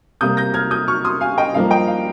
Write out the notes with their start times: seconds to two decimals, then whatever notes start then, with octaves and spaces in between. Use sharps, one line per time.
0.21 C3 G3 A#3 D#6 G6
0.37 G6 A#6
0.54 F6 G#6
0.71 D#6 G6
0.88 C#6 F6
1.04 C6 D#6
1.21 F5 G#5
1.38 D#5 G5
1.54 G2 F3 A#3 F5
1.70 D#5 G5
1.87 F5